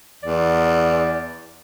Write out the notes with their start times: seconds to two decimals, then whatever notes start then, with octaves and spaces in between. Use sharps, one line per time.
0.23 E2 D5